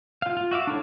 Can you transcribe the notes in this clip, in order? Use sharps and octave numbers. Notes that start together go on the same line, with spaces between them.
F4 F5
F4
F#4 E5 F5 D6
D4 E4 A4 C#5